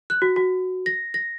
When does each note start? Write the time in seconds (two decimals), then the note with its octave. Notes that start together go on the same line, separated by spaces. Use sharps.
0.10 F#6
0.22 F#4
0.36 F#4
0.86 A#6
1.14 A#6